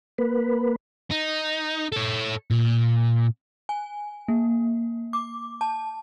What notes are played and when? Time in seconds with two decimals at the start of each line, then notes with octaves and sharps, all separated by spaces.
0.18 A#3 B4
1.11 D#4
1.92 A4 C#5
2.51 A#2
3.69 G#5
4.28 A#3
5.13 D6
5.61 A5